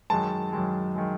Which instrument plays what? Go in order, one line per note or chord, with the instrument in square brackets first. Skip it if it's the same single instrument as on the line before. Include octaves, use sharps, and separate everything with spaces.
[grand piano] F#2 D#3 G#3 A5
F#2 D#3 G#3
D#3 G#3